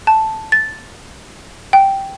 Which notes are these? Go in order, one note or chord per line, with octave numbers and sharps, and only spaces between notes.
A5
A6
G5